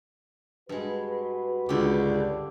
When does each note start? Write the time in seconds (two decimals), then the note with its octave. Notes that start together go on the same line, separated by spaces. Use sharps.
0.69 G2 G#3 F#4 B4
1.69 C#2 D3 G4
2.00 G2